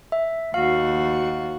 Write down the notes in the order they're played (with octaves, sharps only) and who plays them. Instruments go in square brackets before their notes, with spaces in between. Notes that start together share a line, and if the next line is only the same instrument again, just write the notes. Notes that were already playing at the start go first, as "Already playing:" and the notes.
[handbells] E5
[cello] D#2 F#4 [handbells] F5